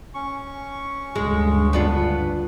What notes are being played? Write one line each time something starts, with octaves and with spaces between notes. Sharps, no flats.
C#4 C#6
D2 G2 C#3 G#3
B3 D4 F4